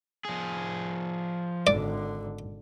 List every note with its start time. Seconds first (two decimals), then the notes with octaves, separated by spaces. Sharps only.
0.25 F3 G#4
1.67 G#1 D3 D5